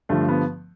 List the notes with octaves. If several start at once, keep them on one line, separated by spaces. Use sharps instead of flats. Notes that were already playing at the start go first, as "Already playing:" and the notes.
G2 D3 F3 A3
B3